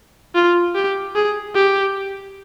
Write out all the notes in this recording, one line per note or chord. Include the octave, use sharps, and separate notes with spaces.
F4
G4
G#4
G4